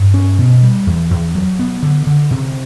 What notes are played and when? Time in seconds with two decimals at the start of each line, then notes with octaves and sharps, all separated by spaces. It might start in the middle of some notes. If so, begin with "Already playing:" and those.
Already playing: G2
0.14 C#4
0.39 B2
0.63 G3
0.87 E2
1.11 E2
1.35 F#3
1.59 B3
1.83 D3
2.07 D3
2.31 C3